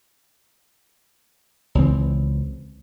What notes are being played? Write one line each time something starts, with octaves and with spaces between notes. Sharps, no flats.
C#2 E3 C4